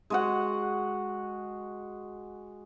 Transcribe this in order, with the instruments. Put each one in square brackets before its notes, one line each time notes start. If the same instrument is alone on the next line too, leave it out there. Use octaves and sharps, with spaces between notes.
[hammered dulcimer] G#3 F#4 F#5